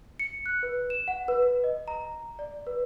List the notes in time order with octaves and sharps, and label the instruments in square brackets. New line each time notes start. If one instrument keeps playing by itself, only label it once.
[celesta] C#7
F#6
B4
E7
F#5
B4
B4
D#5
A#5
D5
B4